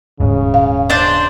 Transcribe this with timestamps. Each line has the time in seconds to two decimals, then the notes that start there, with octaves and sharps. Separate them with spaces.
0.20 D#1 G#2 C#3
0.54 F5
0.90 D4 C5